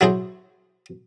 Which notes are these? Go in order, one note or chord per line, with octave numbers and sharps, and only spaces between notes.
F#3 E4 G#4 C5